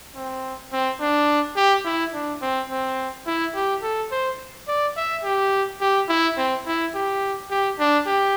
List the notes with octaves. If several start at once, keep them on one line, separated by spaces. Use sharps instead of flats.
C4
C4
D4
G4
E4
D4
C4
C4
E4
G4
A4
C5
D5
E5
G4
G4
E4
C4
E4
G4
G4
D4
G4